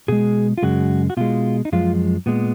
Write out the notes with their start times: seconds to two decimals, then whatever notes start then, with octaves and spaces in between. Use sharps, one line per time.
0.08 B2 G#3 G#4
0.58 F4
0.63 F#2 C#3 G#3 F#4
1.10 F#4
1.17 B2 G#3 F4
1.65 D#4
1.72 F#2 F3 G#3 F4
2.26 A#2 G#3 B3